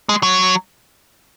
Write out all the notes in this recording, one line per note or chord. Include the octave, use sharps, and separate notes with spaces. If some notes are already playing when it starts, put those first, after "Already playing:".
G#3
F#3